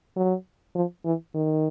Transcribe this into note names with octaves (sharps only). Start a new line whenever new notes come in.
F#3
F3
E3
D#3